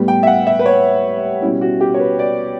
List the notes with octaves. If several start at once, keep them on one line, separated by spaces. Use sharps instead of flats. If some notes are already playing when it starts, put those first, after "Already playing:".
Already playing: A2 G3 B3
G5
E5
F#5
E5
B4
C#5
B2 G3 C#4 E4
F#4
G4
C#5
B4
D5